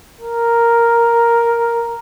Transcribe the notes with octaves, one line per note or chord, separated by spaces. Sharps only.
A#4